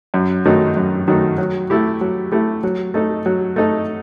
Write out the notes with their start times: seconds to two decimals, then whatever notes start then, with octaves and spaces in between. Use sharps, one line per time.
0.14 F#2
0.46 D#3 F#3 A3 D#4
0.77 F#2
1.08 D#3 F#3 A3 D#4
1.38 F#3
1.70 A3 E4 G4
2.01 F#3
2.32 A3 E4 G4
2.63 F#3
2.94 A3 D#4 A4
3.26 F#3
3.56 A3 D#4 A4